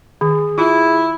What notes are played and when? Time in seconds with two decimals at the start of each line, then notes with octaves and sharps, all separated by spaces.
0.21 D#3 G#4
0.58 E4 F4